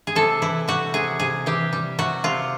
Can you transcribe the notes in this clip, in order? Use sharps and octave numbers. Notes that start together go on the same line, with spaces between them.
G#4
C3 A4
E3 E4
G3 F#4
C3 G#4
C3 G#4
E3 G4
G3
C3 F#4
C3 F4